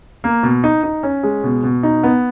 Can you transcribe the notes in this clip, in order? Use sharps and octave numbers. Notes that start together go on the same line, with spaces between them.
A#3
B2
D#4
D#4
C#4
G#3
B2
B2
D#4
B3